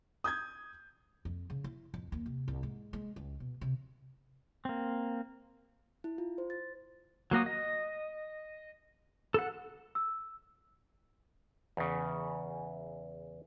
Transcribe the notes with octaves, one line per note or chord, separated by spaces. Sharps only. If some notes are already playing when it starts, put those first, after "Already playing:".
D#6 G6 G#6
F2
C#3
E4
F2
D#2
C3
C2
G#2
G#3
C#2
B2
C3
A#3 C4
E4
F4
C5
A6
F#3 A#3 F#4 D#6
D#5
A4 F#5
E6
E2 C#3